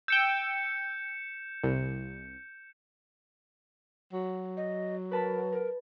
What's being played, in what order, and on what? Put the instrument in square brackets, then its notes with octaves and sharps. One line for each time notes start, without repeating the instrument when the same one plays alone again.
[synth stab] G5 E6 [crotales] G6 C#7 E7
[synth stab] C2
[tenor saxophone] F#3
[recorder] D#5
[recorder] A#4 [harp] B4 A5 B5
[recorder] A#4